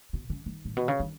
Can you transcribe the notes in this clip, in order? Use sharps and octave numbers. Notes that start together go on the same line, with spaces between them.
B2
C#3
D#3
A2
B2
C#3
D#3